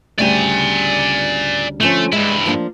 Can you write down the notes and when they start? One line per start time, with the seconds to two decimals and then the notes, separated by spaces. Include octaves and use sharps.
0.19 D2 C#3 G3 D5 G#5
1.81 D3 F3 A3 C#4
2.13 G2 G#3 E4
2.46 F3 A#3 D4